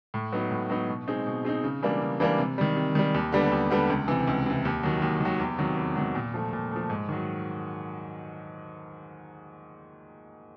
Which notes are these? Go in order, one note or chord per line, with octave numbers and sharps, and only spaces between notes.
A2
F#3 B3 D#4
A2
F#3 B3 D#4
B2
G#3 C4 D#4
B2
G#3 C4 D#4
C#3
E3 G3 A#3 D4
C#3
E3 G3 A#3 D4
C3
D#3 G3
C3
D#3 G3
D#2
D3 G3 B3
D#2
D3 G3 B3
C#2
C3 E3
C#2
C3 E3
D#2
D#3 F#3
D#2
D#3 F#3
E2
C3 D#3 F#3
E2
C3 D#3 F#3
A#2
F3 A3
A#2
F3 A3
G#2
D#3 F#3